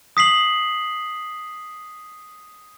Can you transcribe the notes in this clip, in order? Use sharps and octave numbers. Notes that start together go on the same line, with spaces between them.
D#6 B6 C7 F#7